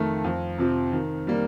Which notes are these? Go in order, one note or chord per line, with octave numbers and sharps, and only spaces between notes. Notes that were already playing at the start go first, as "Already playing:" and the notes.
Already playing: F2 D#3 A3
F2
C3 F3 C4
D#3
G3 A#3